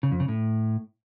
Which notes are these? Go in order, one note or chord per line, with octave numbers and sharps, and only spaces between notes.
C#3
F2
C#3
A2